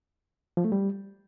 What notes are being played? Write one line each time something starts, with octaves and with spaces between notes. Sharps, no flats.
F3
A3
G3